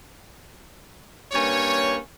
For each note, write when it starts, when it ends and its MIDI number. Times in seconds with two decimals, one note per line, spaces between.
1.32 1.97 43
1.32 1.97 58
1.32 1.97 61
1.32 1.97 73